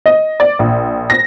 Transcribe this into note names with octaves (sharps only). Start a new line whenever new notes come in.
D#5
D5
A#1
A#6